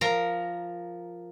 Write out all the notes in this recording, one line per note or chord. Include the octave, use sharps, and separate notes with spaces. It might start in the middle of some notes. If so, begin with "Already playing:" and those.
F3 A#4 A#5